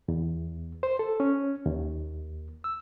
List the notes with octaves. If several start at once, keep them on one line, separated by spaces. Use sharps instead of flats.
E2
C5
A4
C#4
D#2
E6